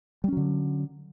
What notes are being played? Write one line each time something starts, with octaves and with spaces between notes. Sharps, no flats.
D3 F#3 G3 C#4